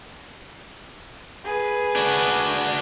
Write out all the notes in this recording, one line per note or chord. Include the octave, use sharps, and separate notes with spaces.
G#4 B4
D4 F#4